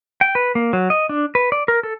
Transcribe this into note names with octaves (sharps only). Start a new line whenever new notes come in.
G5
B4
A#3
F#3
D#5
D4
B4
D5
A#4
A4